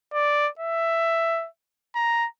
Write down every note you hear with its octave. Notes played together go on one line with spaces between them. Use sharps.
D5
E5
A#5